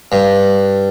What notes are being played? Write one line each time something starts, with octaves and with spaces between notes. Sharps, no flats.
G2